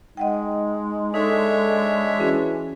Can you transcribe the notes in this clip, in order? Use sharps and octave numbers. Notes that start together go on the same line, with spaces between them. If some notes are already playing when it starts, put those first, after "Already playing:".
G#3 D#4 D#5 F#5 G5
D4 D#4 A4 C#5 E5
E3 C#4 F#4 G#4